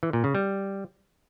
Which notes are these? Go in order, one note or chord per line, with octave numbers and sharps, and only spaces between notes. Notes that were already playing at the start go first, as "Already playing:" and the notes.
E3
A#2
C#3
G3